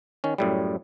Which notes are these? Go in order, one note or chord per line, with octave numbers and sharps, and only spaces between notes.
D#3 C#4
F#2 A2 G3